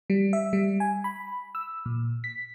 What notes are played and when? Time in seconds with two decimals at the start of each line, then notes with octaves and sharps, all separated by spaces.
0.10 G3
0.33 E5
0.53 G3
0.80 G#5
1.04 B5
1.55 E6
1.86 A#2
2.24 B6